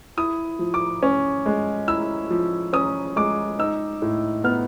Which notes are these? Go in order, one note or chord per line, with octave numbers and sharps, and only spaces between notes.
E4 D#6
F3
D6
C#4
G#3
E4 E6
F3
C#4 D#6
G#3 D6
D#4 E6
A2
B3 F6